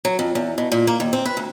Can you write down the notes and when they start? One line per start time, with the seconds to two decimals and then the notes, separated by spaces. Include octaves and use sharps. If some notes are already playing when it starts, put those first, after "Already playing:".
0.05 F#3
0.19 F2
0.35 E2
0.58 B2
0.72 A#2
0.87 A#3
1.00 D#2
1.13 C4
1.25 B4
1.37 D2